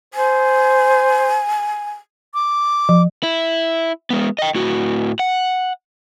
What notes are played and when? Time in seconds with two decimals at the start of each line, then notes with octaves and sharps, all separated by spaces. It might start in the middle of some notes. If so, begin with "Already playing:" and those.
0.14 C5 G#5
2.34 D6
2.89 F3
3.23 E4
4.10 G#3 B3
4.39 D#5 G5
4.55 A2 F#4
5.19 F#5